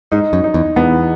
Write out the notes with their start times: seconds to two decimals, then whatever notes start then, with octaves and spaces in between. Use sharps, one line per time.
0.12 G#2 D#4
0.33 F#2
0.44 D#4
0.54 E2
0.76 E2 B3